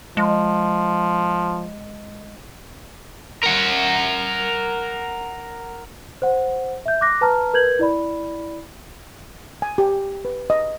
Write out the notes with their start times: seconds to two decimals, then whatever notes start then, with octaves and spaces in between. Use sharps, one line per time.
0.17 F3 G#3
3.43 A#4 F#5
6.22 C5 F#5
6.86 E5 G6
7.01 D6 F#6 A#6
7.21 B4 A5 A#5 F6
7.54 A#4 B4 G6 G#6 F#7
7.79 E4 D5 B5
9.62 G#5
9.78 G4
10.25 B4
10.50 D#5